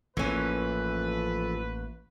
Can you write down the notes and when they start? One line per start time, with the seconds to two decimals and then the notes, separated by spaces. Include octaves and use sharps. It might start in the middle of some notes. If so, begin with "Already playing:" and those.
0.17 A1 E3 F3 A#3 C#4 A4 B4